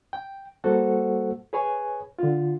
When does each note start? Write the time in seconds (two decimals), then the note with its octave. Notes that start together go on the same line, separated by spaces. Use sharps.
0.13 G5
0.64 G3 A#3 F#4 A4 C5 F#5
1.53 G#4 B4 C#5 G#5
2.19 D3 F4